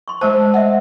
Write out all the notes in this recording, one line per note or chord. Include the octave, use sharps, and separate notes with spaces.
C6 C#6
G#3 A3 C5 A5
D#5 E5 F#5